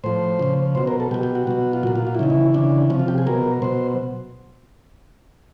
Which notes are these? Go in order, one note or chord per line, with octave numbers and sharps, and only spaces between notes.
A2 F3 C5
C#3 F3
B2 F#3 C5
A#4
A4
B2 F#3 G4
G4
F#4
B2 F#3 F#4
F4
A#2 F#3 F#4
F4
F4
E4
C#3 E3 D#4
E4
C#3 E3 D4
C3 F3 C#4
F4
G4
G#4
B2 F#3 A#4
B2 F#3 C5